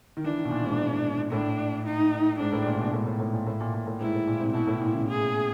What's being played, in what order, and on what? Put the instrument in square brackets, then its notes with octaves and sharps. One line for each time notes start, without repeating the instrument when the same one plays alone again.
[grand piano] D#3
[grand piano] E3 [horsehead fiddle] D4
[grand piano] D#3
B2
A#2
G#2
[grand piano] A2 [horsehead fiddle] D4
[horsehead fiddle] D#4
[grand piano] G#2 [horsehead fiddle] D4
[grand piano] A2
A#2
B2
A2
A2
A2
A#2
A2
A#2
A#2
A2
[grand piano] G#2 [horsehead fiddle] E4
[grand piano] A2
A#2
C3
[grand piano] B2 [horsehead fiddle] E4
[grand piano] A2
A#2
C#3
[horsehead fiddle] G#4